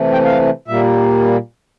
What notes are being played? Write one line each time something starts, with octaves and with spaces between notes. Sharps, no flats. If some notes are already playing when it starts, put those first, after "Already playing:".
Already playing: C3 E3 A3
G5
F5
A#2 G3 A#3 E5